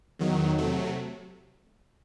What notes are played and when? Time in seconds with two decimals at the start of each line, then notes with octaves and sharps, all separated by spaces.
0.19 E2 D#3 F#3
0.58 C3 F#3 A3